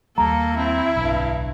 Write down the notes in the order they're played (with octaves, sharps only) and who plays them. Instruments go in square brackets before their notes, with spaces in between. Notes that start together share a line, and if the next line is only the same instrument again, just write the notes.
[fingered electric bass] D#2 G3 [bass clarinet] A#3 [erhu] A4 [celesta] A#5
[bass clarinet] C4 [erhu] E4
[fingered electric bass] D1 B1 [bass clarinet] G2